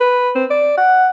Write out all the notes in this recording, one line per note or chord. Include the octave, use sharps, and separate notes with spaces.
B4
C4
D5
F#5